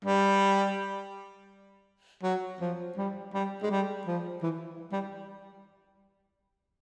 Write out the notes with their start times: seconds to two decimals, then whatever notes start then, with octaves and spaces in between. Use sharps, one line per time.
0.05 G3
2.23 F#3
2.61 F3
2.97 G3
3.33 G3
3.63 G#3
3.71 G3
4.07 F3
4.43 E3
4.92 G3